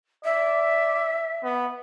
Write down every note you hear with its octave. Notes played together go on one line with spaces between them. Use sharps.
D5 E5
B3